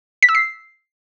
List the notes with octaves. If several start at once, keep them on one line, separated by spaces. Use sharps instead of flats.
B6
E6
C7